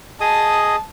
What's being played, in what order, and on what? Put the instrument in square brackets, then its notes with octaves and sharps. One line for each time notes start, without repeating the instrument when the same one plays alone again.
[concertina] G#4 D#5 D#6 [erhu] A5